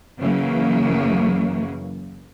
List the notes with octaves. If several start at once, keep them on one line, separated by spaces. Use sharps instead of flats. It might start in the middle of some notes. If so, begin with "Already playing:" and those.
F#2 C#3 E3 F#3 A#3